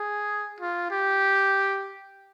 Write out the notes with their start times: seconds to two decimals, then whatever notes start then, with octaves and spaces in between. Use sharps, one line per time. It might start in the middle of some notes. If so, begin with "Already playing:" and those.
Already playing: G#4
0.61 F4
0.91 G4